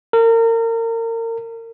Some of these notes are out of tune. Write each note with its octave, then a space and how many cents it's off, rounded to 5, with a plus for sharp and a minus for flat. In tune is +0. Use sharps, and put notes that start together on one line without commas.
A#4 -35